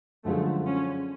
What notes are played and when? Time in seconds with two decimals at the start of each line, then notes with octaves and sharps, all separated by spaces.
0.25 F#2 D3 F3 G#3 A3
0.65 C#4